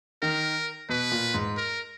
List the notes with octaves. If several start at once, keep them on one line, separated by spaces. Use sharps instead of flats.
D#3 A#4
B2 B4
A#2
G#2
A#4